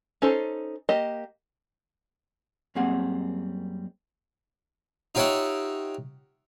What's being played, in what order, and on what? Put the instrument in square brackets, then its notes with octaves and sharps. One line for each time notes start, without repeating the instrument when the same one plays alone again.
[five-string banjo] C#4 D#4 A4 C5
A#3 G4 D#5
[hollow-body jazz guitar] F#2 G3 A#3 C4 G#4 F#5
[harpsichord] D#4 F4 G4 C#5 E5 F#5